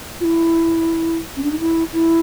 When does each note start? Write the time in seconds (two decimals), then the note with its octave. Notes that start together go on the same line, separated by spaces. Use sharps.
0.20 F4
0.24 E4
1.36 C#4
1.44 D4
1.52 D#4
1.60 E4
1.93 E4